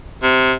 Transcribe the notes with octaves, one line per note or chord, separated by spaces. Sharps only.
C3